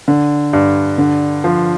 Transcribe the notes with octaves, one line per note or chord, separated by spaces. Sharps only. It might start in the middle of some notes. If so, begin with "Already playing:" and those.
D3
G2
D3
F3